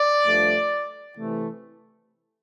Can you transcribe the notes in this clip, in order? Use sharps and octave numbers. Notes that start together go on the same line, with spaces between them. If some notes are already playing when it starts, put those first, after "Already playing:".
Already playing: D5
G2 F3 A3
C3 E3 A3